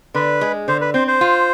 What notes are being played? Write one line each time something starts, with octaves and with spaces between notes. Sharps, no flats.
D3 B4
G#3
D3 C5
B4
C4 C5
C5
F4